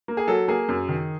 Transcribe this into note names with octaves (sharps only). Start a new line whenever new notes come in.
A#3
G#4
F#3 A4
A#3 G#4
F#2
D#3